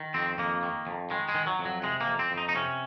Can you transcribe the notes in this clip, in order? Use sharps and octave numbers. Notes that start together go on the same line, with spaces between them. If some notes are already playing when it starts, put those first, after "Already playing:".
Already playing: D#3
F2 C4
F2 A#3
D#3
F2
D#3 G#3
G#3
D#3
F#3
F2
F#3
C3 G#3
A#3
F2
C4
F2
D#4
D#4
C3 C#4